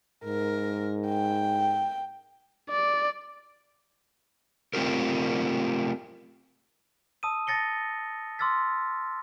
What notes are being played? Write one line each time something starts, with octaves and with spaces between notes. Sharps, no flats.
G#2 A#4
G5
D5
A3 C4 F4 G4 A#4
A5 D#6 E6 D#7
A5 A6 A#6 C#7 G7
C6 D6 E6 F6 A6 B6